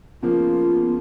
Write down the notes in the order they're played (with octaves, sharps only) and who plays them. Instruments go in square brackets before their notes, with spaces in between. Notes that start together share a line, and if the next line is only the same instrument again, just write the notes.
[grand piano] C#3 F3 A#3 [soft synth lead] B3 [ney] F4